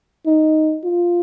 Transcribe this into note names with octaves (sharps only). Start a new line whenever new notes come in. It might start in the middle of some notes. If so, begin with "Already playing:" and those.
D#4
F4